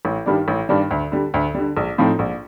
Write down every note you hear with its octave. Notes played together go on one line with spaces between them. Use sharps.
A1
G2 D#3 G3 D4
A1
G2 D#3 G3 D4
D2
D3 G3
D2
D3 G3
A#1
A2 F3 C4 D#4
A#1